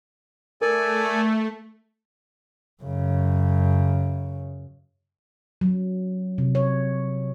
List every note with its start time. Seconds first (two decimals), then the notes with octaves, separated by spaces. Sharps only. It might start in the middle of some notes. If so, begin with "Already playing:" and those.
0.62 A3 A4 A#4 D5 G#5
2.83 F#2 C#3
5.61 F#3
6.38 C3
6.55 C#5